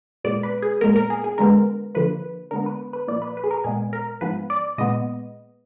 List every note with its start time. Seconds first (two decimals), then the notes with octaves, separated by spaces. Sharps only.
0.24 A#2 G#3 B3 D5
0.43 B4
0.62 G#4
0.81 A#2 G#3 B3 A#4
0.96 A#4
1.10 G#4
1.24 G#4
1.38 D3 G#3 B3 A#4
1.95 D3 F3 A#3 B4
2.51 D3 G#3 B3 A#4
2.66 B4
2.93 B4
3.08 A#2 F3 A#3 D5
3.22 B4
3.37 B4
3.44 G#4
3.51 A#4
3.64 A#2 G#3 B3 G#4
3.93 A#4
4.21 G#2 F3 B3 B4
4.50 D5
4.78 A#2 G#3 B3 D#5